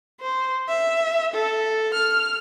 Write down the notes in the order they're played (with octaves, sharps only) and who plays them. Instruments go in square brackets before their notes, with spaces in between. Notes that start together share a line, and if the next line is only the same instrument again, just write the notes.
[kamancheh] C5
E5
A4
F6